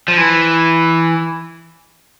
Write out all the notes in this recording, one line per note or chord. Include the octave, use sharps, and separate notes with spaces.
F3
E3